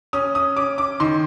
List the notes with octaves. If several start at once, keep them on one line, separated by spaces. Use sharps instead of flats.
C#4 D#6
D#6
C#4 D6
D6
D#3 C6